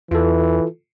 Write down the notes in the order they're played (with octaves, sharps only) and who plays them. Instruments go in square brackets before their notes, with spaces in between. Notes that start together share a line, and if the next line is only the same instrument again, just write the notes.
[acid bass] E2 [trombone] E3 [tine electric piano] F4 A4